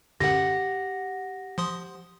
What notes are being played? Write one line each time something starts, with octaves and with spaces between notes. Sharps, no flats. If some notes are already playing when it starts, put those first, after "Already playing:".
F#2 D3 G4 F#5 A#6
F3 C6 D#6